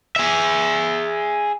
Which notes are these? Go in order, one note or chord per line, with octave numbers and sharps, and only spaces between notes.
G#4 E5